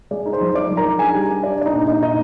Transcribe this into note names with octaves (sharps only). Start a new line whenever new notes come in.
G#3 D5
D#4
C5 C6
F3
D#4 D5 D6
F3
A#4 A#5
D#4
D4 G#4 G#5
G3
D4
D4 D5
D4 D5
D#4 D#5
A#2
A#2 D#4 D#5
A#2 D#4 D#5